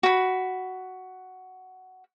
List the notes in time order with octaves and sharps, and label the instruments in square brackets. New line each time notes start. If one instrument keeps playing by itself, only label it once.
[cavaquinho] F#4 B5